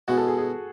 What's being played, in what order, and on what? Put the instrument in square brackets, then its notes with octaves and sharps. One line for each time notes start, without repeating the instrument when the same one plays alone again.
[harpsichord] B2 G#3 C#4 E4 [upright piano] F#4
[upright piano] A4
G#4
G#4